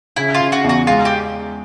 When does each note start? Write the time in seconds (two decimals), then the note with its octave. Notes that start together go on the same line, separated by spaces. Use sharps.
0.16 C#3 E4
0.34 F4
0.41 C#3
0.52 F#4
0.64 E2
0.69 F#4
0.87 G#3 F4
1.05 G4